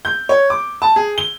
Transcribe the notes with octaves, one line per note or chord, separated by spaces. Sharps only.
G6
C#5
D6
A5
G#4
G7